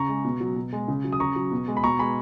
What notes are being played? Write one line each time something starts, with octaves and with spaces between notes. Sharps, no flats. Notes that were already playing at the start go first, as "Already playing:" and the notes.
Already playing: C#3 A#5 C#6
G#3
B2
F#3
B2
G#3
C#3
F#3
D#6
C#3 A#5 C#6
F#3
B2
G#3
B5
B2 A#5 C#6
G#3 G#5 B5